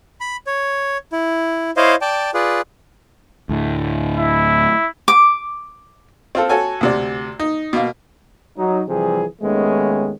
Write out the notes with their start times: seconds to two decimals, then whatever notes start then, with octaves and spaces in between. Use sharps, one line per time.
0.21 B5
0.47 C#5
1.13 E4
1.77 E4 C5 C#5 D#5 F5
2.01 D5 G5 A5
2.34 F4 G#4 B4 D5
3.49 D2 A2
4.16 E4
5.08 D6
6.35 C4 F4 A4
6.49 F#4 A4 C#5 G#5
6.81 D2 C3 D5
7.40 D#4
7.73 B2 A#3
8.57 F#3 D#4
8.88 C3 E3 F3 G3 G#4
9.42 D#2 D#3 G#3 A3 B3 C#4